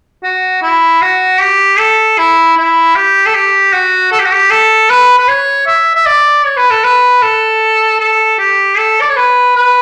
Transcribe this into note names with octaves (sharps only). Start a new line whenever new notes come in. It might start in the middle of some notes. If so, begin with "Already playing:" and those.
F#4
E4
F#4
G4
A4
E4
E4
G4
A4
G4
F#4
A4
G4
F#4
G4
A4
B4
B4
C#5
E5
E5
D5
C#5
B4
A4
B4
A4
A4
G4
A4
D5
C#5
B4
B4